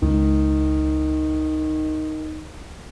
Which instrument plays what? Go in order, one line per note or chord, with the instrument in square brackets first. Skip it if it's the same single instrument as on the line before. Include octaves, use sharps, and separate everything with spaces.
[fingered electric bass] C#2 G#3 [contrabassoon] D#3